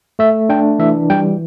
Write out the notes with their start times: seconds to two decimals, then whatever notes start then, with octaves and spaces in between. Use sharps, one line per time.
0.19 A3 E5
0.49 D4 G5
0.79 E3 E5
1.10 G3 G5